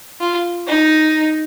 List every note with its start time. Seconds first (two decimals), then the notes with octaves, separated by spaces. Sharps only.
0.21 F4
0.67 D#4